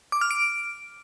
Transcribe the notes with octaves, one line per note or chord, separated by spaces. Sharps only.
D6
F6
D7